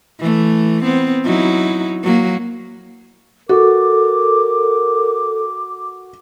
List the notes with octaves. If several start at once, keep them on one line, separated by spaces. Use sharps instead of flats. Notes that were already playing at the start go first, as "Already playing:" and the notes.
E3 A3
B3 C4
F#3 D#4 E4
F#3 A#3
F#4 A4 A#4 D6